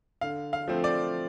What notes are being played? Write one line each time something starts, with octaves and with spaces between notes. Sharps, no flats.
D3 F5
F5
F3 A3 C4
D5